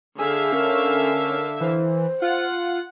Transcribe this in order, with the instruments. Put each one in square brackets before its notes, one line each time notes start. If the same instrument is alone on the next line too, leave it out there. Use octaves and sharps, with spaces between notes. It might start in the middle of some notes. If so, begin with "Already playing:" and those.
[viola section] D3 E5 F5 [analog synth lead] G#4
[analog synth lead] C#4 [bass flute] A#4
[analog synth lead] E3 [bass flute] C5
[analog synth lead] F4 [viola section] F#5